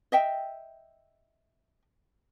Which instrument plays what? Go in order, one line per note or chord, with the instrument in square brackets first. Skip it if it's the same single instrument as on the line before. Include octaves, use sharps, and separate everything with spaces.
[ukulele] D#5 E5 G5